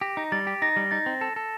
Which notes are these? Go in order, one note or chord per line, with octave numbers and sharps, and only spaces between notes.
G4 A#6
D#4
G3 A6
G4
D#4 A#6
G3
D#4 A6
C4
A4
A4